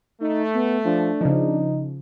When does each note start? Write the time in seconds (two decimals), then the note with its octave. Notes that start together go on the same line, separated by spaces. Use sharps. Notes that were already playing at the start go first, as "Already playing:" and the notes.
0.21 A3 D#4
0.54 B3
0.85 F3 D4
1.21 C#3 F3 D#4